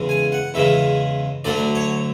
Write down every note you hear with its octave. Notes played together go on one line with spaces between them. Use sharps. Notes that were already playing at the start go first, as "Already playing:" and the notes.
Already playing: E2 C#3 E3 G#3
G#5
F#5
E2 C#3 E3 G#3 E5
D2 D3 F#3 A3 D5
C#5